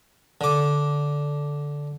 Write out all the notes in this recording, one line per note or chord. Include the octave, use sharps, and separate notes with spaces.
D3 D6